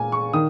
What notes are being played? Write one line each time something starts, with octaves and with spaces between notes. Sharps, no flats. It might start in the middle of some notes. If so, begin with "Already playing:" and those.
Already playing: A#2 G#3 G#5
C#6
D#3 D#6